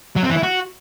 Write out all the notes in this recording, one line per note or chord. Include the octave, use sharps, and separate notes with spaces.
F#3
C4
E3
E4
F#4